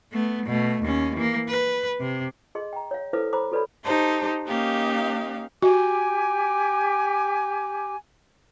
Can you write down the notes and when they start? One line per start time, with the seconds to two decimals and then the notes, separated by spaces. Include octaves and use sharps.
0.13 A3 B3
0.46 B2 A3
0.83 D#2 C#4
1.16 E3 A#3
1.48 B4
2.00 C3
2.55 G#4 D#5 C6
2.73 G5 A#5
2.91 C#5 F5
3.13 E4 A4 B4 C5 F5 D6
3.33 C5 A#5 B5 D6
3.51 F#4 A4 B4 C#5 D5 B5
3.84 D#4 G4 A4 C5
4.47 A#3 C#4 D#4 G4 F5
5.62 F#4 G4 G#5 D6